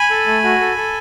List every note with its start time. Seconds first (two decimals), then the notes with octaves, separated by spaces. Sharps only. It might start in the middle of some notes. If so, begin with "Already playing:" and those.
Already playing: G#5 B5
0.11 A4
0.27 A3
0.44 F#4
0.61 A4
0.77 A4